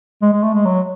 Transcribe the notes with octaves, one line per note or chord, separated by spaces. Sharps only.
G#3
G#3
A3
G#3
F#3